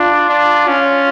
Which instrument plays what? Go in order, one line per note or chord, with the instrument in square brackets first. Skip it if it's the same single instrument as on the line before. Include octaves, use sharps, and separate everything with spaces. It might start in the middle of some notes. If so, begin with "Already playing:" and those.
Already playing: [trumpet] D4 [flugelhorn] F4
[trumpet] D4
[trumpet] C#4 [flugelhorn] F4